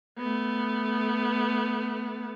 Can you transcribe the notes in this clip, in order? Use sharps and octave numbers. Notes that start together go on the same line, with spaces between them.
A3 B3